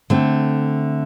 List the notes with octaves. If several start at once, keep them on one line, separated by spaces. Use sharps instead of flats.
D3 A3 C4